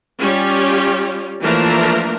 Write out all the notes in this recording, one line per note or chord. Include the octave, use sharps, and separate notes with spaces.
G3 C#4 F4 G4
E3 F3 A3 A#3 D4 A#4